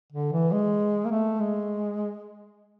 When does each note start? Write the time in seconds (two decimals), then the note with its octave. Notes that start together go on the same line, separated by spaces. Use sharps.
0.12 D3
0.32 E3
0.52 G#3
1.06 A#3
1.11 A3
1.40 G#3